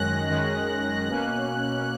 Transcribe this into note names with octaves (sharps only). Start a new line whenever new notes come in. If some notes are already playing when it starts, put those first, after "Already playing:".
Already playing: F#2 D#3 G#3 C#4 F#6 A#6
F#2 D#3 G#3 C#4
B2 A#3 C#4